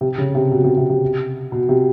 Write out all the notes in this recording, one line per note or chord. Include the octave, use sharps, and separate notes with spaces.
C3
C#3
C3
B2
C3
C3
C3
B2
C3